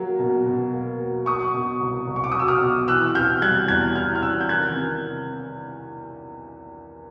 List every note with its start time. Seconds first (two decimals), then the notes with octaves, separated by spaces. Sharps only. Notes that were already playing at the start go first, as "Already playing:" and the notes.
Already playing: F#3 A#3
0.19 B2
0.46 B2
0.73 A#3
0.99 F#3
1.26 F#3 C#6 D#6
1.54 B2
1.81 C2
2.07 C2
2.16 C#6
2.24 D6
2.32 D#6
2.35 F#3 E6
2.48 D#6 F6
2.61 B2
2.88 E3 E6 F#6
3.15 C3 F6 G6
3.42 G3 F#6 G#6
3.68 E2 F#6 G#6
3.95 E3 F6 G6
4.15 F6
4.22 C3 E6 F#6
4.41 G6
4.49 D#3 F#6 G#6
4.76 C3